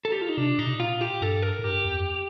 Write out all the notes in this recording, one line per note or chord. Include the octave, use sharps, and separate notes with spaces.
A4
G4
F4
D#4
C3 D4
A#2 D#4
C3
A#2
F4
G4
G2 A4
A#4
A2
G2 G4
F2
F2